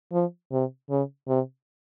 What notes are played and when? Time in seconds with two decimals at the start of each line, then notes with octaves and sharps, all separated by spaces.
0.12 F3
0.52 C3
0.90 C#3
1.28 C3